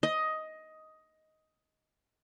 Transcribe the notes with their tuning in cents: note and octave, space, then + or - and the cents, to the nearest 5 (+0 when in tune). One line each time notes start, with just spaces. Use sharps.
D#5 +10